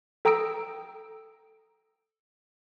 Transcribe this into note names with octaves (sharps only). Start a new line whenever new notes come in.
A4 G5 A#5 D#6 E6 D7